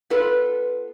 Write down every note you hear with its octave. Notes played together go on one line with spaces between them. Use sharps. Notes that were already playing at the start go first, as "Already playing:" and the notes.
B3 F4 A4 B4